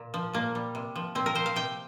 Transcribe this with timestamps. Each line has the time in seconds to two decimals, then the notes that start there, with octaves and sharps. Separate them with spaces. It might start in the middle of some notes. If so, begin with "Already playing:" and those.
Already playing: A#2
0.14 F3
0.33 A#2 A#3
0.55 G3
0.75 C3
0.96 F3
1.15 A#2 C4
1.26 A#4
1.35 F3 C5
1.46 F5
1.56 C3 G5